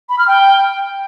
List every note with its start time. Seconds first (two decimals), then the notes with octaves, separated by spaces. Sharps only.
0.09 B5
0.19 F6
0.28 G5